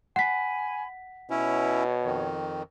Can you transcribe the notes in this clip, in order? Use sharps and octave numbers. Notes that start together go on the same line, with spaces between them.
F#5 G#5 B5 B6
B2 C#4 E4 C#5
F2 D#3